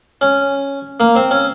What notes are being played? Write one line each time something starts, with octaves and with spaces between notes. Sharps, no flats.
C#4
A#3
C4
C#4